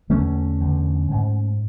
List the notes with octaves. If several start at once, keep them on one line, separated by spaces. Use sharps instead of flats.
E2 D3 A3 C#4
E2 D3
G#2